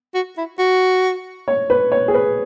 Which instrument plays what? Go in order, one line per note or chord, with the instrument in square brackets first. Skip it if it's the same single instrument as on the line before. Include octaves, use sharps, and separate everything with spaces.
[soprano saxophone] F#4
E4
F#4
[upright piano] C#5
B4
C#5
G#4
B4